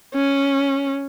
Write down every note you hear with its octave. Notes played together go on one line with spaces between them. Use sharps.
C#4